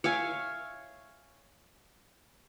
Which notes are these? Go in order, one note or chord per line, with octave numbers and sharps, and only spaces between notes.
C#5 E5 F5 G#5